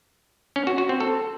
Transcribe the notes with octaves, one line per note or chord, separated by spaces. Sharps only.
C#4
F#4
F#4
C4
A4